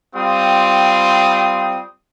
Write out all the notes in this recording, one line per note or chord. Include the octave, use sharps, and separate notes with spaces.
G3 C4 F4 D#6